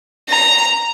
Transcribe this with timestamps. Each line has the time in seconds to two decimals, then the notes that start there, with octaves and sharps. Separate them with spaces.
0.30 A#5